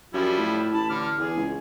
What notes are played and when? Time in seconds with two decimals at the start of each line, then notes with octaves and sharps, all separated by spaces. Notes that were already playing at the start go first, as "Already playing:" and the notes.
0.14 F#2 F3 G3 E4
0.37 A2
0.73 A1 A5 B5
0.90 D3 D6 F6
1.18 E2 G#4
1.37 C#2